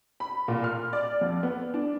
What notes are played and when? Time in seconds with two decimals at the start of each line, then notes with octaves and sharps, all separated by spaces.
0.20 B5
0.48 A#2
0.64 F6
0.93 D5
1.21 F2
1.43 B3
1.74 D4